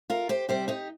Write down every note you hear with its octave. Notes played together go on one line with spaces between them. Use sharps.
F4 A#4
G4 C5
C3 G3 C4 G4 C5
D#4 G4